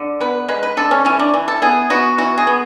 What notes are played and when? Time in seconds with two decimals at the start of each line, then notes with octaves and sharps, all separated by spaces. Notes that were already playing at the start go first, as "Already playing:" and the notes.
Already playing: D3
0.21 B3 B4
0.48 G#3 B4
0.63 B4
0.77 D3 A4
0.91 C#4
1.05 E3 C#4
1.19 D4
1.34 E3
1.48 A4
1.62 B3 G#4
1.90 B3 F#4
2.18 E3 F#4
2.38 G#4
2.47 B3